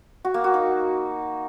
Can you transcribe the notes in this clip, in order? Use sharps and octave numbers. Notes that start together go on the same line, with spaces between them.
F#4
A#3
F#4
D#4